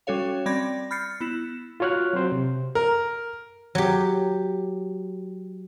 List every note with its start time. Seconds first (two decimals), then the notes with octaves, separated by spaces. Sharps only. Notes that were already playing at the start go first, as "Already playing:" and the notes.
0.07 G3 C#4 F#4 A4 C#5 F5
0.46 G3 C4 D5 B5 G#6 A#6
0.91 B5 F6 G6 A6 C7 C#7
1.21 B3 E4 E7
1.80 F4 F#4 C#5 F6 F#6
2.13 F#3 C4 C5
2.32 C3
2.75 A#4
3.75 F#3 G4